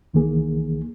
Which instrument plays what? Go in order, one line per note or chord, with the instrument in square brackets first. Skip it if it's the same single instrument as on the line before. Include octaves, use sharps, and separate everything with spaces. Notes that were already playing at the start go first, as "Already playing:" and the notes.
[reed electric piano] C2 D#3 E3 A#3 G#4